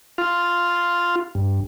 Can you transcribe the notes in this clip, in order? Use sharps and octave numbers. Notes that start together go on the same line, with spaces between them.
F4
G2